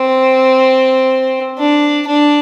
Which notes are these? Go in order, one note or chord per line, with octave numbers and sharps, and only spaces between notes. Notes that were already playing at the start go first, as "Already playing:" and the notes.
Already playing: C4
D4
D4